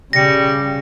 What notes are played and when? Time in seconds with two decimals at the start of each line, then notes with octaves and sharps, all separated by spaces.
0.13 C#3 G3 A#6 C#7